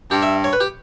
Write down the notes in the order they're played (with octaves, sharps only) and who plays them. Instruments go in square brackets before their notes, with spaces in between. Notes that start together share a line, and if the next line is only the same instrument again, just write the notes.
[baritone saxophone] G2 [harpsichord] G4
[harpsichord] E5
C#5
B4
G4